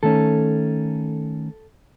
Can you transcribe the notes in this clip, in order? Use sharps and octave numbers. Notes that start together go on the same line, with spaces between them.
D#3 A3 C#4 A4